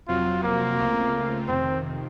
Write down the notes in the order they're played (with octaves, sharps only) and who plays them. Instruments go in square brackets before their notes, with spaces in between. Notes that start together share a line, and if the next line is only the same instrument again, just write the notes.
[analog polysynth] F2 C3 F#3 C4 F#4 [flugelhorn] F4
[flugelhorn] A#3
[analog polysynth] C#2 C#3 A3 C4 F4
[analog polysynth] F2 C3 D#3 [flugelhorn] C4